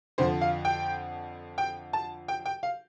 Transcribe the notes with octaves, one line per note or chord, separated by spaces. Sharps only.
F2 D3 F3 C5
F5
G5
G5
A5
G5
G5
F5